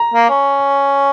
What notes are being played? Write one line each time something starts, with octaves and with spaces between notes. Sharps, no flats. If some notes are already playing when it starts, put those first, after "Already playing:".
Already playing: A#5
A#3
C#4